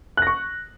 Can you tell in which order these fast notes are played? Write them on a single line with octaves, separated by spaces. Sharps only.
F#6 A#6 C#6